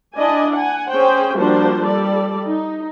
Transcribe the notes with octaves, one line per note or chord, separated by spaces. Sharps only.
D4 E4 D5 D#5 G#5
F#5 G#5
C#4 G#4 C5 G5
F3 G3 A#3 D4 F#4 C5
G3 A4 D5
D#4